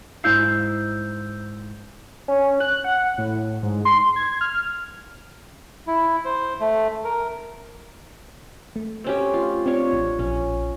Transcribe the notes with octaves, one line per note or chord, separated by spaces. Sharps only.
G#2 E4 F5 E6 G6
C#4
F#6
F#5
A2
G#2
C6
G#6
F6
E4
C5
A3
A#4
A3
C4 C#4 G4
F4
C4 D4 F4 C#5
A1
A#1 C#4